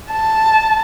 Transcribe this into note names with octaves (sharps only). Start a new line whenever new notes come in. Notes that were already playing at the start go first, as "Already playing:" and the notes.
A5